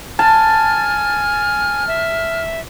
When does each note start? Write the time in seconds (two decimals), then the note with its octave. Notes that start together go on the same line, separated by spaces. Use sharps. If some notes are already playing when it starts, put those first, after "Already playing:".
0.19 G#5 A5 F6
1.88 E5